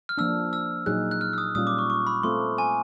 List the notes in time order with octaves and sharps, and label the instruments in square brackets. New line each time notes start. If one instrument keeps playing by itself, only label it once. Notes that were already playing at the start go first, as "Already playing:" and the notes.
[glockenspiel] F6
[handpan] F3 A#3 D4 [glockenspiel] E6
[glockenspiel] E6
[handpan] A#2 F#3 A#3 D#4 G#4 [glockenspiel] F#6
[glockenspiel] F#6
F6
E6
D#6
[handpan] A#2 G3 A#3 C#4 F4 [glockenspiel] D#6
[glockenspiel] D6
C#6
C#6
B5
[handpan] A3 C4 F4 A4 [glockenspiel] C6
[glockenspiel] G#5